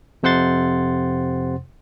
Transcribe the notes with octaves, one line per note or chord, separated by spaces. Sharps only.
F2 C3 C5 F#5 C6 A6